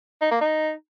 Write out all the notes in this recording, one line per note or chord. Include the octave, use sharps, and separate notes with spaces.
D#4
A#3
D#4